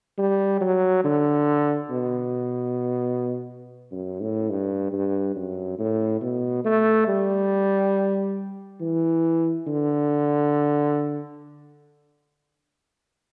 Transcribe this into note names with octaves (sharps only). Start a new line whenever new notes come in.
G3
F#3
D3
B2
F#2
A2
G2
G2
F#2
A2
B2
A3
G3
E3
D3